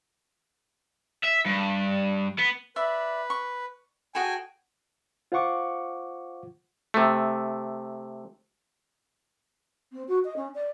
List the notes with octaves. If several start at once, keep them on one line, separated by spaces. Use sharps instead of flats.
E5
G2
B3
B4 D5 E5
C#6
F#4 G#4 A4 G5 G#5
F4 C5 F5 F#5 C#6 D6
C3 A3
C4
F#4
D#5
C#4
D5